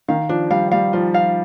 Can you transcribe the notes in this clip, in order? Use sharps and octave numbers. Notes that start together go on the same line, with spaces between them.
D#3 F5
F3 D4
G3 F5
G3 F5
F3 F4
F5